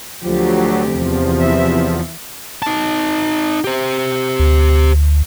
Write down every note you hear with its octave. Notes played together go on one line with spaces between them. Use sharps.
D2 F3 F#3 G4
E2 C3 F3
E3 E5
D#4 A5
G4 C5
D2